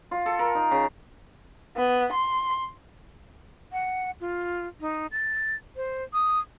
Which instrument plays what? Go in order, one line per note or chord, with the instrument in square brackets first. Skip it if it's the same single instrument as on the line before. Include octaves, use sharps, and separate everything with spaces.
[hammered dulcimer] F4
A4
A#4
D#4
C#3
[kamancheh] B3
C6
[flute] F#5
F4
D#4
A6
C5
D#6